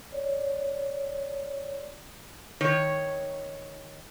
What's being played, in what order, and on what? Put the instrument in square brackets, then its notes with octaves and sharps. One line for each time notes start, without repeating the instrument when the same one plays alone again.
[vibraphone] C#5 D5
[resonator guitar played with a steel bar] D#3 C#5